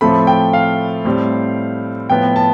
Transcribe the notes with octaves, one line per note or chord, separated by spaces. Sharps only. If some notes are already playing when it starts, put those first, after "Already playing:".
A2 F3 A3 C4 B5
G5
F5
A2 G3 C4
A2 F3 B3 G5
A5